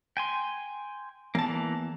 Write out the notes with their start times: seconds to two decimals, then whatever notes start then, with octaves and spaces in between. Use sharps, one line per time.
0.17 G5 G#5 C6
1.35 E2 E3 A#3 A5